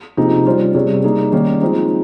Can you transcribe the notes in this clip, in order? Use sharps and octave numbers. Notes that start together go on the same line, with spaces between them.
C3 F3 A#3 D#4 G#4
G3 C#4 F4 C5
C3 G3 C#4 G#4 C#5
G3 A#3 D#4 G#4
D#3 G3 A#3 C#4
F3 G#3 C4 D#4